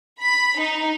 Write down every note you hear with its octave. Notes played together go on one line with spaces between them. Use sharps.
B5
D#4